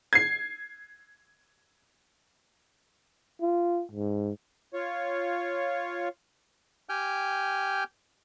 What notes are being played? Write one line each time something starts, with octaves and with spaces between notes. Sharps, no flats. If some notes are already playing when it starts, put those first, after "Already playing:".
G#6 C7
F4
G#2
F4 C#5
G4 G5 G#5 F6 G6